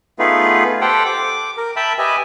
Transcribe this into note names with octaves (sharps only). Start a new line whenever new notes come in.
A3 B3 D#4 F4 G#4 B4
G4 A4 C5 F#5 G5
D6
A#4
E5 G5 A5 B5
G4 B4 D#5 E5 G#5